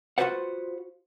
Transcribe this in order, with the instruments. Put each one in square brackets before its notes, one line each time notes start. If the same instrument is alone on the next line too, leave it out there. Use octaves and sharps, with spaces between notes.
[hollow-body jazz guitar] F4 F#4 A4 B4 C5 F#5